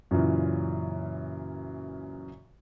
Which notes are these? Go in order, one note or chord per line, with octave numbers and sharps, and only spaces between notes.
F#2 A#2 C#3 E3